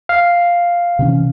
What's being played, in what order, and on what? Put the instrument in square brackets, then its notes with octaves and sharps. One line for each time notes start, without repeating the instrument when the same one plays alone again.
[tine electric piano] F5
[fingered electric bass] C3 E3 C#4